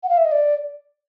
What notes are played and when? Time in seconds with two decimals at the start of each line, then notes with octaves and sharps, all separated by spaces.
0.03 F#5
0.09 F5
0.17 E5
0.25 D#5
0.32 D5